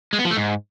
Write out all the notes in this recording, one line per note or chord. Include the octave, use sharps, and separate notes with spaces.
G#3
B3
F3
A3
G#2